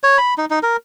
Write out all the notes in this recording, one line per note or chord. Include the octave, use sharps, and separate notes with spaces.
C#5
B5
D#4
D#4
A#4